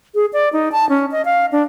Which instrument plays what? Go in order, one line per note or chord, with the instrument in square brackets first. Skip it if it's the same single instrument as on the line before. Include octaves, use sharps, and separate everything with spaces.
[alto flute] G#4
D5
D#4
A5
C#4
D#5
F5
D4